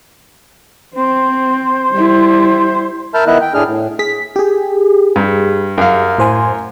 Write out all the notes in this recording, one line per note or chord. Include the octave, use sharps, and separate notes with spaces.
C4 C5
G3 E4
A#4 E5 A5 B5 F6 G6
D#3 B3 E4 D#5 E5 F#6
G5
A2 A3 D4 G#4 F6
A2
G#4 B6
G4 G#4
G2
F#2 F5
A2 C5 G#5